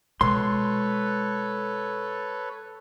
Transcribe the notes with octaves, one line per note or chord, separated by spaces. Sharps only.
B2 G#3 A4 B4 C#5 C6